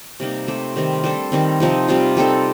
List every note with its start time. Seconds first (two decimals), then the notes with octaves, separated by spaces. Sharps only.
0.20 C3 G3 A#3 D#4
0.48 A3 C4 G4 C5
0.76 C3 D#3 G3 C4
1.04 G3 D4 A4 C5
1.32 D#3 G3 C4
1.60 C3 F3 C4 D#4
1.88 C3 G3 C4 F4
2.17 G3 C4 D#4 A4